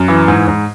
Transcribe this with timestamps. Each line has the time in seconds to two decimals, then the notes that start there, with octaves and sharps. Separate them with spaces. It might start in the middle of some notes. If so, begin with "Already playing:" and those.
Already playing: F#2
0.08 E3
0.28 G#2
0.48 G#2